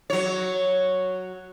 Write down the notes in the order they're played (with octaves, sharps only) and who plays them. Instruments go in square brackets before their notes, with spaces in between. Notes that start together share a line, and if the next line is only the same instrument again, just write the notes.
[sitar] F#3 C#5